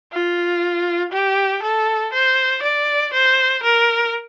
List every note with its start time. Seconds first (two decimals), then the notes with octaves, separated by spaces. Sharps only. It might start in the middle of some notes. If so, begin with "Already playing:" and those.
0.12 F4
1.12 G4
1.63 A4
2.13 C5
2.63 D5
3.13 C5
3.63 A#4